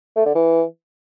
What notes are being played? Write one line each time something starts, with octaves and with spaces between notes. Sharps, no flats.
A3
D3
E3